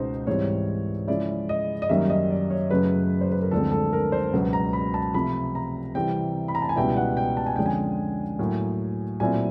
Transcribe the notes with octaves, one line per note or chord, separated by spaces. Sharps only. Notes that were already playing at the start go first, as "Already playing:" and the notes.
Already playing: C#2 B2 G#3 B3 D#4 C5
G#2 E3 G3 C4 C#5
C#3 F3 G#3 C#4 E4 D5
D#5
D#5
F#2 D#3 G3 A#3 C#4 E5
D#5
D5
C#5
F#2 C#3 F#3 A3 B4
C5
B4
A#4
D2 D3 F3 G#3 C4 A4
A4
A#4
C5
C#2 B2 F#3 B3
A#5
B5
A5
C3 F3 A3 B5
A#5
C3 E3 G3 C4 G5
B5
A#5
A5
G#5
C#2 B2 G3 B3 E4 G5
F#5
G5
A5
G#5
F2 D3 F3 G#3 C#4 G5
G#5
A2 F#3 A#3
A#2 F#3 A3 C4 E4 G#5